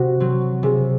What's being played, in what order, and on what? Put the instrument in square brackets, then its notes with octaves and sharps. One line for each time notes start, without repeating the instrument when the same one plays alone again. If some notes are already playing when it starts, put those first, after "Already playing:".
Already playing: [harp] C3 [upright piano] F#4
[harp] F#3 C4
[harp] C3 [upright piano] G#4